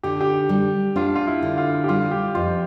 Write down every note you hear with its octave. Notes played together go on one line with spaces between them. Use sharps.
D3 G4
G4
G3
D4 F4
F4
E4
D3
F4
G4
G3 F4
G4
F2 F4